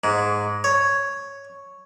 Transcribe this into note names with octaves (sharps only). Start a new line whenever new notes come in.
G#2
C#5